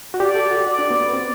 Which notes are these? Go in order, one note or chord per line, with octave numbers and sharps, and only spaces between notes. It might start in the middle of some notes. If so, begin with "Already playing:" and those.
F#4
G4 D5
A4
F#4
F#4 D5
D4
B3
B3
C4